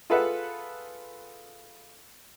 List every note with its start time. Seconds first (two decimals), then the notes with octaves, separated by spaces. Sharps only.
0.10 F4 G#4 A4 B4 E5 F#5